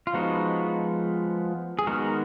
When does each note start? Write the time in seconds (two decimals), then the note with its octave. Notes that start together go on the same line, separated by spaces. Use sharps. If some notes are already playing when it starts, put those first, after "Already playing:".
0.07 F4
0.14 F3 G#3 B3 D#4 F#4
1.79 G#4
1.87 D#3 G#3 B3 F#4 A#4